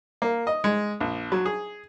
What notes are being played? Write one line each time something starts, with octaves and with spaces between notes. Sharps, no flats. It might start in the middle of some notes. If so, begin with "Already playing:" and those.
A#3
D#5
G#3
A#1
F#3
G#4